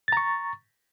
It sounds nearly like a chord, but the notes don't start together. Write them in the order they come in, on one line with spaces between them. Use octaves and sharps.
A6 A#5 C#6